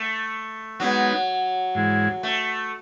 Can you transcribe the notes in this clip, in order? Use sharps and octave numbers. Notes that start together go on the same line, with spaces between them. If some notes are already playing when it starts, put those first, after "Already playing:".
Already playing: A3
F#3 G#3 B3 D#4 F#4
G#2 E3 G#3
A3